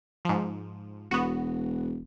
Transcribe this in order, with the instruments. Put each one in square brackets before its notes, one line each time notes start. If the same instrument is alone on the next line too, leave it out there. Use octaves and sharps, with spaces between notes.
[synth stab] G#2 F3
[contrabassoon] E1 [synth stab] B3 F#4